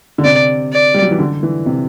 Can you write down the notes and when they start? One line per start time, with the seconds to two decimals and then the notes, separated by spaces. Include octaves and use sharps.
0.18 D3
0.24 C3 D5
0.72 D5
0.94 G3
1.02 F#3
1.11 E3
1.19 D3
1.43 E3
1.66 C3